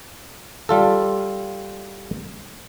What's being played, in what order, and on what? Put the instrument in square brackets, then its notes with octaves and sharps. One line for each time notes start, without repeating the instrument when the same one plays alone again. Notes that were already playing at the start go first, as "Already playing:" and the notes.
[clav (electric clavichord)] G3 F4 A4